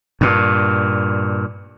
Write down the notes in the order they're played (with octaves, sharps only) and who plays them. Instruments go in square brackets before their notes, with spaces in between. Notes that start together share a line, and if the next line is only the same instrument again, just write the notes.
[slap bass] G2 A#2